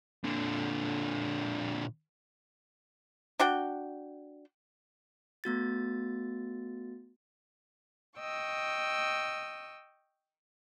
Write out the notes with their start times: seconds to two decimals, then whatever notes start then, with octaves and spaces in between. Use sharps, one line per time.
0.24 A#2 D3
3.39 D4 F#4 G5
5.44 A3 B3 F#4 A6
8.19 D#5 G5 C#6 E6